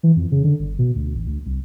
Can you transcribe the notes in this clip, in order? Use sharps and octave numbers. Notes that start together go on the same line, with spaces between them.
E3
F2
C#3
D3
G1
B2
D2
A1
D2
C2